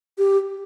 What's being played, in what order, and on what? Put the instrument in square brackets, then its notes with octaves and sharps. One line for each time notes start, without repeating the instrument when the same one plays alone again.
[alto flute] G4